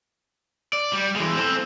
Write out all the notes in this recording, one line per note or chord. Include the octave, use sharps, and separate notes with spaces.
D5
G3
E3 G#3
C4 A4